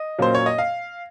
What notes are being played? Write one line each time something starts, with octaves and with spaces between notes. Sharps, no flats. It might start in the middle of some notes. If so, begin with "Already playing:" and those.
Already playing: D#5
A#2 F#3 A#3 C#4 C5
C#5
D#5
F5